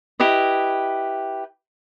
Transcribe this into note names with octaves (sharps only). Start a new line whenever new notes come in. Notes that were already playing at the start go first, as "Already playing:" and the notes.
E4 G4 B4 D#5